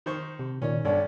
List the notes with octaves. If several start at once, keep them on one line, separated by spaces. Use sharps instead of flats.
D#3 C5 C#6
C3
A#2 D#3 C#4 D5
B1 G2 C#4 D5